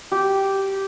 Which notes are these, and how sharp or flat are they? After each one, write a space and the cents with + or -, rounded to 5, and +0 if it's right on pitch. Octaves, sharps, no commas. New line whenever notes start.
G4 -10